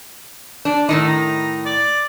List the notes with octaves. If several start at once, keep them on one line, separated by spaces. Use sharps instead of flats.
D4
A2 D#3 D#4
A#5
D5